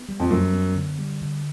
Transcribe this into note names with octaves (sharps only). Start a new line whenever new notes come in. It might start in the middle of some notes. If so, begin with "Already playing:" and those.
Already playing: B3
G3
F2
F#2 G3
B3
D3
G3
D3